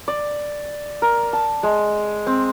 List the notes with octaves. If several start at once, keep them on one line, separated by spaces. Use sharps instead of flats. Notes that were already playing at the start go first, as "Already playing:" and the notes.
D5
A#4
A5
G#3
C4